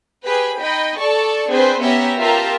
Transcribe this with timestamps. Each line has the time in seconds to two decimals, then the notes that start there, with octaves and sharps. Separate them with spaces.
0.25 G4 G#4 B4 B5
0.60 D#4 D#5 G5 B5
0.99 A4 D5 A5 C#6
1.49 C4 D4 G#4 B4 C5
1.80 B3 C#4 G4 E5 A#5
2.20 F4 G4 A#4 E5 A5 A#5